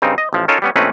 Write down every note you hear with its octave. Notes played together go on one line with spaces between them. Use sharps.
G2 C#3 C4 D#4
D#5
A1 F3
C#4 D#4 F4 A4 A#4 C#5
G3 B3 C#4
A#1 A3 C4 C#4 D#4 B4